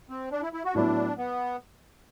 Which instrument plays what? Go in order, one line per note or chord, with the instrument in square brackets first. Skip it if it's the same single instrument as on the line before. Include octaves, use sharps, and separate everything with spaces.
[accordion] C4
D4
E4
E4
F#4
[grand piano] A2 F#3 B3 E4 [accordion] D4
[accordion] B3